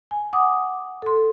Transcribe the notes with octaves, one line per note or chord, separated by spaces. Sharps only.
G#5
F#5 D6 D#6
A4 C6